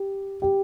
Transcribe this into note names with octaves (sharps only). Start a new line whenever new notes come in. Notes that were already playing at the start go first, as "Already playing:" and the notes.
Already playing: G4
G4